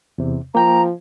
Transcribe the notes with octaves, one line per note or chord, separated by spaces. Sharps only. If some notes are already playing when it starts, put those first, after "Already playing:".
E2 C3
F3 A#3 G5 A#5